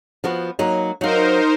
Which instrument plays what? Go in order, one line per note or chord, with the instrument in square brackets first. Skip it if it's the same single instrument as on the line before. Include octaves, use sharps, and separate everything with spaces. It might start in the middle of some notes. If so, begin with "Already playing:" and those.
[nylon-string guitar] F3 B3 F#4
F#3 A#3 D#4
[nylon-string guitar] F#3 F5 [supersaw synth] D#4 A#4 C5